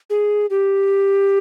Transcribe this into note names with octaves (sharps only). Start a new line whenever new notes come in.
G#4
G4